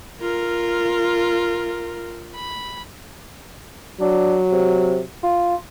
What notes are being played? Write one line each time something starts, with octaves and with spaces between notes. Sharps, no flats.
F4 A#4
B5
F#3 D4
C3
F4